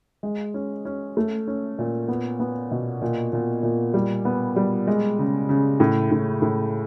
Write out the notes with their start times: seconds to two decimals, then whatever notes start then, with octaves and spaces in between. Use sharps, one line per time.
0.23 G#3
0.54 C#4
0.85 C#4
1.17 A3
1.48 C#4
1.78 A#2
2.08 B3
2.40 B3
2.71 B2
3.02 A#2
3.33 A#2
3.63 A#2
3.94 G3
4.25 B3
4.56 G3
4.87 G#3
5.19 C#3
5.49 C#3
5.80 A2
6.11 A2
6.42 A2